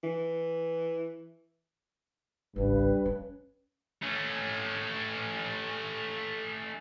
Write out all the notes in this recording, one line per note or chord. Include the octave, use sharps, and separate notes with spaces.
E3
G#1 C#2 G2 B4
C#4
A3 C#4